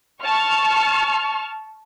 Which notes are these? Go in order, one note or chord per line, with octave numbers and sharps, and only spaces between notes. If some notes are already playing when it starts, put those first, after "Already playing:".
A5 C#6 F6